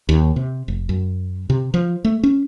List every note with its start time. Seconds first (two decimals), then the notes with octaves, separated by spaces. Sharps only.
0.09 D#2
0.36 C3
0.68 F1
0.89 F#2
1.50 C3
1.74 F3
2.05 A3
2.23 C#4